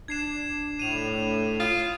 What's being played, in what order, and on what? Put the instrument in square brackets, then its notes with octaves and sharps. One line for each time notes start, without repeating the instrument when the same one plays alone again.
[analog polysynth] D4 [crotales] G#6 C7 E7
[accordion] A2 [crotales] D#7 F7
[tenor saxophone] F4 [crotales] D#6 D#7